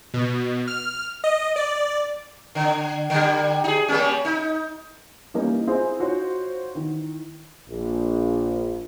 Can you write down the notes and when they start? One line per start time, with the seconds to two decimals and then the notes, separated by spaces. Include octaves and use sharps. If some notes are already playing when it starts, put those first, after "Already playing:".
0.14 B2
0.68 F6
1.24 D#5
1.56 D5
2.55 D3
3.10 D3 G3
3.64 D#4 G#4
3.88 G3 A#3 C#4
4.25 D#4
5.34 E3 G3 A#3 C#4 D#4 A#4
5.67 C4 E4 F4 G#4 C5
5.99 D#4 F4 F#4 C5 C#5
6.75 D#3 E3
7.69 A#1